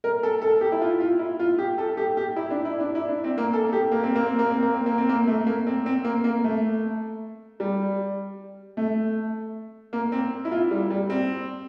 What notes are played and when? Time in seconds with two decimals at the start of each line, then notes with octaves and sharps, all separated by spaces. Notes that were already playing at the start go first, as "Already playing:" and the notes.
0.04 A#4
0.23 A4
0.42 A4
0.61 G4
0.72 E4
0.81 F4
1.00 F4
1.19 E4
1.39 F4
1.58 G4
1.78 A4
1.97 G4
2.17 G4
2.36 E4
2.51 D4
2.65 E4
2.80 D4
2.95 E4
3.08 D4
3.24 C4
3.38 A#3
3.53 A4
3.73 G4
3.92 A#3
4.03 C4
4.15 A#3
4.27 C4
4.39 A#3
4.51 C4
4.62 A#3
4.74 C4
4.86 A#3
4.98 C4
5.09 A#3
5.27 A3
5.47 A#3
5.67 C4
5.86 C4
6.05 A#3
6.24 A#3
6.44 A3
7.60 G3
8.77 A3
9.93 A#3
10.12 C4
10.45 E4
10.52 F4
10.71 G3
10.90 G3
11.10 C4